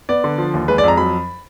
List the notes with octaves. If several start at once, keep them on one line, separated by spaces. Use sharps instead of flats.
B3 D5
D3
F3
D#2
G#3 B4
D5
F2 A#5
F#3 B5